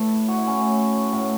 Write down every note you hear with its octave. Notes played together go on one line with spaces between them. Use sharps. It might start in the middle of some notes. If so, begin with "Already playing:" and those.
Already playing: A2 A3 A4 B4
F#4
E4
A2 A3 C#4
A2 A3